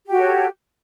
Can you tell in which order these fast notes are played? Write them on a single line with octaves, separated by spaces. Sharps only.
G4 F#4 A4 C#5